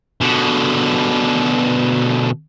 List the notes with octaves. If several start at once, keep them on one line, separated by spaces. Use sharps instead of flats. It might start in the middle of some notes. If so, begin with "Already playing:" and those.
B2 D3